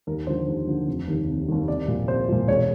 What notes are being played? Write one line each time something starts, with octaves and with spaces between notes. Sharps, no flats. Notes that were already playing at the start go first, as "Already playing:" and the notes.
D#2 A#4
D3 F3 C5
D#2
D3 F3
F1
D#2 D#3
F1
D#2 D#3
C2 D5
A#2 F3
C2 C5
A#2 F3
E1 C#5